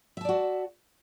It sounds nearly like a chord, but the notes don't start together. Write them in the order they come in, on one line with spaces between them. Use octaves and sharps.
E5 A5 D5 F#4